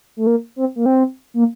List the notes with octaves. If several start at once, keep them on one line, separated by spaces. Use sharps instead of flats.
A3
A#3
C4
A#3
C4
A#3